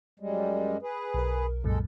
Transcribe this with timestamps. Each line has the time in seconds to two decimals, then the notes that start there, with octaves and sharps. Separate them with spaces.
0.20 F#2 G3 G#3
0.82 G#4 B4
1.14 B1 A#4
1.64 C2 F#2 A#2 G#3 A4